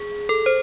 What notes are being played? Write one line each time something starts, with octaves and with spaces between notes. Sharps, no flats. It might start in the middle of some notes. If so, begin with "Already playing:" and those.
Already playing: G#4
A4
C5